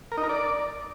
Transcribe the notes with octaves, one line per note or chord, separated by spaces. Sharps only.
A#4
D#4
A#4
D5